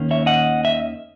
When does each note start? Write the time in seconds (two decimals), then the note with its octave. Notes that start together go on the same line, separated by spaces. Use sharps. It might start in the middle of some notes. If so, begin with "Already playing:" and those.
Already playing: D#2 D#3 A#3 C#4
0.11 C#5 E5
0.26 D#5 F#5
0.65 E5